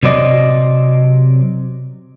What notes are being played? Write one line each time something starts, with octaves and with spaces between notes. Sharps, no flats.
C3 F#3 C4 D5 D#5